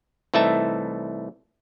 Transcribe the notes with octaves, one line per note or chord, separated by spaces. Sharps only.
C2 E3 A3 D#4 E5 A5